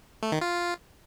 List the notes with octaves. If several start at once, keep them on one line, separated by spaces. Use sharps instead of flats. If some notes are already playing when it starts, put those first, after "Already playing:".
A3
D#3
F4